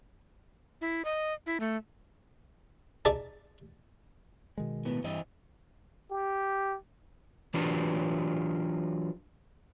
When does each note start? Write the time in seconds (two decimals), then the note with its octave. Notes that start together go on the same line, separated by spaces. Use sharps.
0.81 E4
1.05 D#5
1.46 E4
1.60 A3
3.05 D#4 G#4 D5 E5 A5
4.58 B2 D#3 G#3
4.85 A2 B3
5.04 G2 E3 C5 D#5
6.11 G4
7.54 E3 F#3 D4 F4 G4